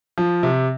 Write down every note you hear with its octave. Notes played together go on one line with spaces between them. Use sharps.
F3
C3